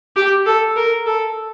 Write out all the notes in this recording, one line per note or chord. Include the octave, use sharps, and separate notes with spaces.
G4
A4
A#4
A4